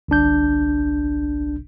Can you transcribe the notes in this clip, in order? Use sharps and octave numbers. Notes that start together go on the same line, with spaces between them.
G1 C2 D4 G6